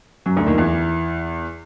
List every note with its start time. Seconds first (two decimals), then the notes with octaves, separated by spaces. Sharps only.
0.26 F#2 F#3
0.36 D2 D3
0.46 D#2 D#3
0.53 F3
0.58 E2 E3